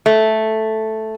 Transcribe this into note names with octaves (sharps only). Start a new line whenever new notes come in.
A3